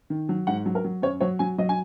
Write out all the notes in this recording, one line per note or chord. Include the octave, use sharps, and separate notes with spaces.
D#3
F#3
G#2 F#5
F#3
A#4
F#3
F#2 C#5
F#3 C#5
F#3 G#5
F#3 D#5
G#5